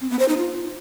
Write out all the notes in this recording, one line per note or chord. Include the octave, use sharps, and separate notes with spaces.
C4
B3
C5
D#4
F4